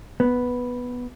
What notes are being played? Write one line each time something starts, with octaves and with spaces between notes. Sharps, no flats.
B3